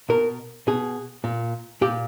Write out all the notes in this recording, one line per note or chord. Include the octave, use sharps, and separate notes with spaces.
B2 A#4
B2 G#4
A#2
A#2 G4